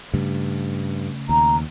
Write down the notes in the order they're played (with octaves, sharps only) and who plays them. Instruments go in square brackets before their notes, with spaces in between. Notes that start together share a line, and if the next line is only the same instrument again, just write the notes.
[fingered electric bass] G2 [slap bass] C#3 A3
[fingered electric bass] D#2 [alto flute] A#5